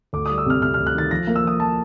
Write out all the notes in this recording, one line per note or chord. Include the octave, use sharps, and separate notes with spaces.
D2 D6
D#6
G3
E6
C3 F6
C3 F6
F6
D2
F#6
D#3 A6
F3 A#6
A#3
E6
F3 D#6
F3 A5